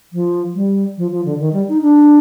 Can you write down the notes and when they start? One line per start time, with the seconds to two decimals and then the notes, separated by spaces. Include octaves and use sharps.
0.13 F3
0.55 G3
0.98 F3
1.11 F3
1.25 D3
1.40 D#3
1.53 G3
1.68 D#4
1.82 D4